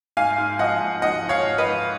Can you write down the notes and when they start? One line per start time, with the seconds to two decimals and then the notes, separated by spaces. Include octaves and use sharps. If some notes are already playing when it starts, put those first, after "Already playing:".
0.17 G#2 F5 G#5
0.38 G#2
0.59 F3 D#5 F#5
0.80 G#2
1.02 G#2 D#5 F#5
1.23 F3
1.29 C#5 F5
1.44 G#2
1.58 B4 D#5
1.66 G#2